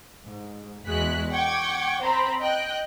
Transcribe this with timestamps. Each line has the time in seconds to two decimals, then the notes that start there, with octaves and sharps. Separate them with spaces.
0.23 G#2
0.85 E2 G#3 F#4 F#6 B6
1.32 F#5 G5 C#6 D6 G#6
2.01 C4 C5 A#5 B5
2.40 D#5 G5 F#6